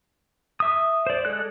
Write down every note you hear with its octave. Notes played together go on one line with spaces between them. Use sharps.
E5 D#6
C5 D5
G#3 A4 D5 F#6